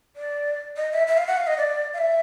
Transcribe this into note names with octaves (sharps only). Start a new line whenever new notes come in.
D5
D#5
E5
E5
F5
F#5
F5
D#5
D5
F5
E5